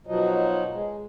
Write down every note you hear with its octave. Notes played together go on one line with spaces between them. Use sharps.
B2 F3 F#3 D#4
G#3